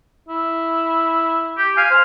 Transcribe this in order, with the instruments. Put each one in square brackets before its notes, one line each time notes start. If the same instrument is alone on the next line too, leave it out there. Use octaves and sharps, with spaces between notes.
[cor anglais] E4
[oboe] G4
[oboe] F5 [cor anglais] G#5
[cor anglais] C5